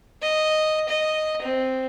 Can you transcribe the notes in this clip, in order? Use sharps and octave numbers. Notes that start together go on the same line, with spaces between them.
D#5
D#5
C4